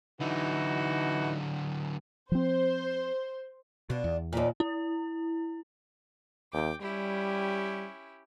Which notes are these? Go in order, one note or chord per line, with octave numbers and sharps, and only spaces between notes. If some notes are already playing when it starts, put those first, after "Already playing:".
D3 E3 F#3 D#4 F#4
F3 C4 C5
B2 D4 F4
E2
D#2 A#2 B4 D5
E4
D#2 G5 D6
G3 C#4 E4 G4